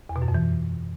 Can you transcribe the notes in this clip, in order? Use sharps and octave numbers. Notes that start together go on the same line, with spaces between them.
E2
B2
F#2
F2
E3